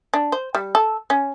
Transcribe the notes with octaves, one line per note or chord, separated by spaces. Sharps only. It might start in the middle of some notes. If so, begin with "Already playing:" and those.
D4
C5
G3
A4
C#4